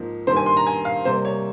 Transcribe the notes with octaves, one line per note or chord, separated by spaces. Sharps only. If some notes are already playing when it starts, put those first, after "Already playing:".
Already playing: G#2 F3 A#3 D#4
G2 D#3 G3 A#3 C5
G#5
C6
A#5
G#5
F5
C3 G3 A#3 C5
C#5